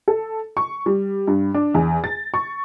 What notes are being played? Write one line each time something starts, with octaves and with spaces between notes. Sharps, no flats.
A4
C#6
G3
G2
D4
E2
A6
C#6